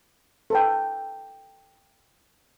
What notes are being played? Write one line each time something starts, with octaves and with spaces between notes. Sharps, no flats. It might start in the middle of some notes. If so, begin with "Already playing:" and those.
A4 B4 G5